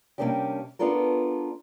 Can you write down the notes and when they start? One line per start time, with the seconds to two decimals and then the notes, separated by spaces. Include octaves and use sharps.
0.18 C3 G3 A#3 C#4 D4 G4
0.79 B3 D4 F4 A4 A#4